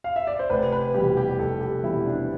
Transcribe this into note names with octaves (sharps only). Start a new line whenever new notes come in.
F5
E5
D5
C5
F1 B4
B4
E2 B2 G3 G4
G4
F1 A4
G4
E2 B2 G3 E4
D4